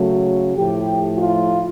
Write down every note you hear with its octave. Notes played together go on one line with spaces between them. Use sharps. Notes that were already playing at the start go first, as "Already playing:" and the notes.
Already playing: C#3 F#3 A3
A2 F3 A3 G4
F4